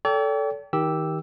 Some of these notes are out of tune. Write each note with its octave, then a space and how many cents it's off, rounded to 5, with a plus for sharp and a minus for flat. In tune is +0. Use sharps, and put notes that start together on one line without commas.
A4 +0 D5 -45 G5 +0
D#3 +25 G4 +0 E6 +0